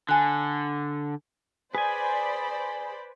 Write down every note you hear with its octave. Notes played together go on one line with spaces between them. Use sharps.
D3 G#5 F#6
G#4 B4 C5 D5 G#5 B5